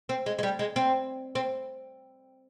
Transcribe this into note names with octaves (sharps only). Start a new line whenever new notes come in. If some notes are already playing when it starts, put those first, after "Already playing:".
C4
G#3
G#3
G3
G#3
C4
C4